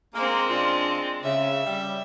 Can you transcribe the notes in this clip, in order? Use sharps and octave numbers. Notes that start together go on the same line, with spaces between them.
G#3 A#3 C4
C#3 D4 F4
C#3 E5
G3